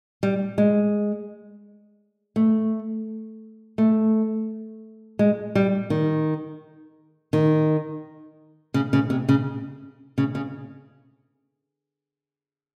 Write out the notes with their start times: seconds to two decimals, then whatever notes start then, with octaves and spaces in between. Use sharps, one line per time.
0.23 G3
0.58 G#3
2.36 A3
3.78 A3
5.19 G#3
5.55 G3
5.90 D#3
7.33 D#3
8.74 C#3
8.93 C#3
9.10 C3
9.29 C#3
10.18 C#3
10.35 C#3